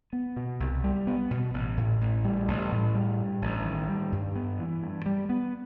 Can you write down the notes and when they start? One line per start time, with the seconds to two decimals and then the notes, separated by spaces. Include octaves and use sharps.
0.13 B3
0.36 B2
0.60 C2
0.84 G3
1.07 B3
1.31 B2
1.54 A1
1.77 A2
2.01 A1
2.24 G3
2.48 A1
2.72 A2
2.95 G3
3.18 G2
3.42 A1
3.65 D#3
3.88 G3
4.12 G2
4.36 B3
4.59 E3
4.83 G2
5.06 G3
5.29 B3